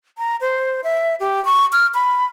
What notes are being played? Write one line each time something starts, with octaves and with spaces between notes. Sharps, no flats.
A#5
C5
E5
G4
C#6
F6
B5